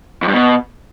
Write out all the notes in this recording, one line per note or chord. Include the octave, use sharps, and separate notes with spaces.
F2
G2
B2